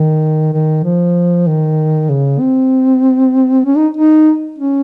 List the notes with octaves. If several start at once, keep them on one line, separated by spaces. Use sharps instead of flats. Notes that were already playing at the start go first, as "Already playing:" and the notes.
Already playing: D#3
D#3
F3
D#3
C#3
C4
C#4
D#4
D#4
C#4